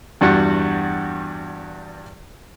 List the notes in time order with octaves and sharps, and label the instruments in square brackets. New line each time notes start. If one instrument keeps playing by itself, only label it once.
[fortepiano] E2 G2 G3 F#4 F#5